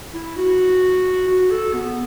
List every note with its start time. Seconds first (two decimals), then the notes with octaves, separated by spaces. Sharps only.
0.14 E4
0.37 F#4
1.28 F#4
1.51 A4
1.74 B3